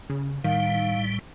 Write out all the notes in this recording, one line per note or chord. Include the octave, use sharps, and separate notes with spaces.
C#3
A2 D#3 G3 F5